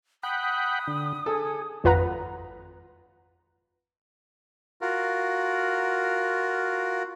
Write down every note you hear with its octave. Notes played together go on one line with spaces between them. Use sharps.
F#5 G5 B5 D#6
D3
G#4 A4
G#1 F2 F4 B4 F#5 A#5
F4 F#4 A#4